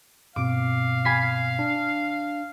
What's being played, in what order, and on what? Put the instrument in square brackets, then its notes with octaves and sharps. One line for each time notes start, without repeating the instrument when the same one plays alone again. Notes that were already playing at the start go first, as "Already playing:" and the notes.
[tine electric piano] G2 B2 C4 [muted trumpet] F5 [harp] D6
[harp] G#5 B5 C7
[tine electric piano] D4